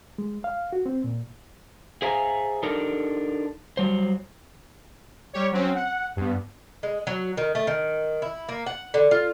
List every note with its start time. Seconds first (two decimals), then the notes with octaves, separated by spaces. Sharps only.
0.18 G#3
0.44 F5
0.73 F#4
0.86 C4
1.04 A#2
2.02 G#4 C5 E5 F5 G#5 A#5
2.63 D4 D#4 G4 A4 A#4
3.77 F#3 G3 C5
5.33 G3 G4 C#5
5.52 F#3 C4 C#4
5.75 F#5
6.16 G2 B3
6.83 G#3
7.07 F#3
7.37 D#3
7.55 A3
7.67 D#3
8.22 E4
8.49 A#3
8.66 F#5
8.94 D3
9.11 F4